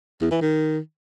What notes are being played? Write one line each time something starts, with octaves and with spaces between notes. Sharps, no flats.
E2
E3
D#3